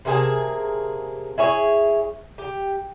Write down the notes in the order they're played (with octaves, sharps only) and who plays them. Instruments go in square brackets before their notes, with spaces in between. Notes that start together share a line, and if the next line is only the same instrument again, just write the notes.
[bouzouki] C3 A#3 G#4 A5
E4 G#4 C#5
G4